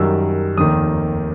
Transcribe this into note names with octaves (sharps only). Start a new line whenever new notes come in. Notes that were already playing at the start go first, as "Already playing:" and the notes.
Already playing: F#2 D#3 G3 E6
F1 D#2 D#3 D#6